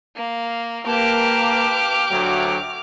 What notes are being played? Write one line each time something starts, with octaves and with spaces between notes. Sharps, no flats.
A#3 F5
A#3 G4 B4 F5 A5 D6 F6
D2 F#3 E5